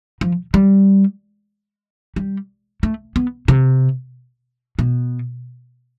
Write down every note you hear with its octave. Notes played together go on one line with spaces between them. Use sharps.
F3
G3
G3
A3
B3
C3
B2